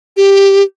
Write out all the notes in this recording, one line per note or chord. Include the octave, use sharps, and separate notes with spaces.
G4